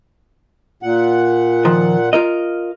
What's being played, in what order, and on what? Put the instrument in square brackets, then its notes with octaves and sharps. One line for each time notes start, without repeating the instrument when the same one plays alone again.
[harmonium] A#2 F#5
[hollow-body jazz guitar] D#3 F3
F4 A#4 D#5